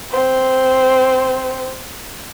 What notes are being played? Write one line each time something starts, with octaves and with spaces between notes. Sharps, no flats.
C4 C5